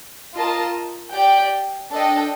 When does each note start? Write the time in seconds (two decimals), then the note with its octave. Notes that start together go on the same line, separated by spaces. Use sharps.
0.34 F4 A#4 D#5 A5
1.12 G4 D5 G5
1.91 D4 A4 D#5 G5